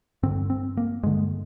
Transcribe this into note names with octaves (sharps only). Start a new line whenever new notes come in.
G2 D3 C4
C4
A#3
G2 D3 G#3